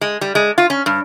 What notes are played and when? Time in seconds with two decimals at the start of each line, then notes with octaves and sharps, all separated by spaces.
0.01 G#3
0.21 G3
0.35 G#3
0.58 F4
0.70 C#4
0.86 G2